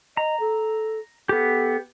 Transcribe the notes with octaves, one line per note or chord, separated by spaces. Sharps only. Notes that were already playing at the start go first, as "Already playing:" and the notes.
D#5 A#5
A4
B3 G4 A4